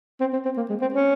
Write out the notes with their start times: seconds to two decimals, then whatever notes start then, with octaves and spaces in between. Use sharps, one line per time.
0.21 C4
0.33 C4
0.45 C4
0.57 A#3
0.70 G#3
0.81 C4
0.94 C#4